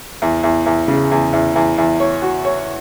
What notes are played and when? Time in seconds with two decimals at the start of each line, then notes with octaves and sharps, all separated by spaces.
0.22 E2
0.43 E2
0.66 E2
0.88 C#3
1.12 E2
1.33 E2
1.56 E2
1.78 E2
2.00 C#5
2.22 F#4
2.45 C#5